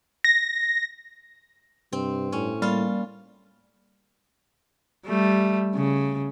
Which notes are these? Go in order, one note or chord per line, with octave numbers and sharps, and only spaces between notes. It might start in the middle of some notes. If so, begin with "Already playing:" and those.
A#6
G2 C3 C4
A2 C#4
G3 A#3 F4 F5
G3 A3
C#3